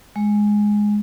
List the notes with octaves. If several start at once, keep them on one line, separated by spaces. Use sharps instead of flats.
G#3